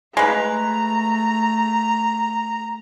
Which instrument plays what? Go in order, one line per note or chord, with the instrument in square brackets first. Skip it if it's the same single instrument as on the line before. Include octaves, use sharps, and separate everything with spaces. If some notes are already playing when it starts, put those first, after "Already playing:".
[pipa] G#3 B4 [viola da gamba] A3 [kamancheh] A#5